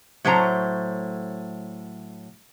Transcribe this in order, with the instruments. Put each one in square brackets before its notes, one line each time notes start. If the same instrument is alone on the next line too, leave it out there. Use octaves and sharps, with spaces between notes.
[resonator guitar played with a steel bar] A2 F#3 A3 C5 A#5